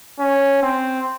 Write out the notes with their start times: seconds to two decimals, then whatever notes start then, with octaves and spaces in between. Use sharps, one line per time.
0.19 C#4
0.62 C4